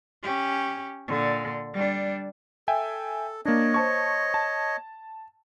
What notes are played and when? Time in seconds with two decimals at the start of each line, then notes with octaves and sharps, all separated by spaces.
0.23 C#4 G4
1.08 A#2 D3
1.74 G3 D4
2.68 A4 E5 G5 G#5
3.45 A#3 D4 C#5 D#5
3.74 C5 A5 C#6
4.34 A5